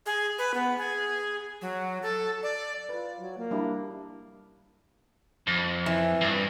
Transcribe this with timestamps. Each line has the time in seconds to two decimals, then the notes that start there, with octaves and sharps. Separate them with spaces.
0.06 G#4
0.38 B4
0.54 B3
0.78 G#4
1.61 F#3
2.02 A4
2.43 D5
2.89 F4 B4
3.20 F#3
3.38 A#3
3.51 G3 D4 E4
5.47 F2
5.86 E3
6.21 G2